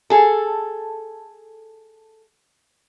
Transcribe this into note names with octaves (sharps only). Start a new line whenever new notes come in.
G#4 A4